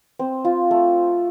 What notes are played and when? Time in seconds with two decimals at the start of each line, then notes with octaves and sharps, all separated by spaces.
0.19 C4
0.45 F4
0.71 A3